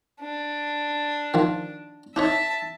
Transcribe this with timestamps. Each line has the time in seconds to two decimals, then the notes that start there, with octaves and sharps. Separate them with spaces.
0.21 D4
1.34 D#3 F3
2.16 D4 D#4 C#5 E5 A5